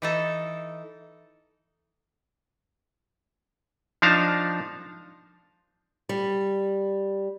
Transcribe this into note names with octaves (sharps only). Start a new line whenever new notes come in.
E3 D#4 A4
F3 D4 D#4 F5 A5 A#5
G3